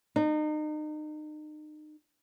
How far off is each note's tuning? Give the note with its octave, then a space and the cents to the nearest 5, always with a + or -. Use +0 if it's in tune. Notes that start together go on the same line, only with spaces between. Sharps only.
D#4 -35